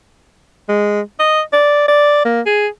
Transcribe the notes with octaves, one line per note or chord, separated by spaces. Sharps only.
G#3
D#5
D5
D5
A#3
G#4